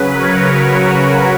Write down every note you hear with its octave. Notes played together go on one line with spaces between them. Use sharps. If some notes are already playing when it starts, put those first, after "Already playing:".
Already playing: C#3 F#3 B4
A#4 C#5
F#4 A#4